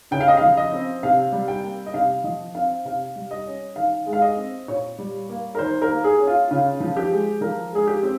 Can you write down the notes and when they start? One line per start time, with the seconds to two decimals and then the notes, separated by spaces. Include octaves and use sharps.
0.11 C#3 G5
0.20 F5
0.28 D#5
0.37 F3 F5
0.57 D#5
0.72 C4
1.03 C3 F5
1.32 G3
1.48 G5
1.63 A#3
1.86 D#5
1.94 C3 F5
2.24 F3 D#5
2.55 C4 F5
2.85 C3 F5
3.16 G3
3.31 D#5
3.46 C#4
3.76 D#3 F5
4.06 G#3
4.13 F5
4.22 D#5
4.37 C4
4.68 A#2 C#5
4.98 G3
5.29 A#3
5.55 A#4
5.59 D#3 C5
5.82 A#4
5.90 A#3
6.04 G#4
6.19 C#4
6.27 F4
6.51 C#3 F4
6.80 F3
6.96 G4
7.11 G#3
7.41 F3 A#4
7.71 G#3 G#4
7.87 G4
8.03 C4